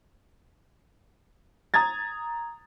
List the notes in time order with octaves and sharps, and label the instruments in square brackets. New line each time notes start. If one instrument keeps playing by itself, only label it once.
[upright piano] A#5 D#6 G#6 A6